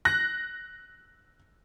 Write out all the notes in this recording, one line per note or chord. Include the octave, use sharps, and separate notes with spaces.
F#6 A#6